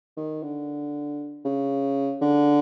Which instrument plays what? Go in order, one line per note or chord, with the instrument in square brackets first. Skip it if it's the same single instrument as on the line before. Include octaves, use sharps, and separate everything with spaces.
[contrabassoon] D#3
D3
C#3
D3